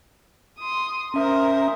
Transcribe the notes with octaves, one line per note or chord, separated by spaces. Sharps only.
C6 D#6
C#4 A#4 C5 E5 D#6